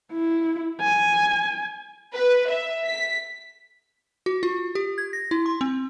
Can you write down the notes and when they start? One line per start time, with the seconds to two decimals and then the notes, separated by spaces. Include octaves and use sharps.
0.12 E4
0.81 G#5
2.13 B4
2.49 E5
2.86 B6
4.26 F#4
4.43 F4
4.75 G4
4.98 G#6
5.13 A#6
5.31 E4
5.46 C6
5.61 C4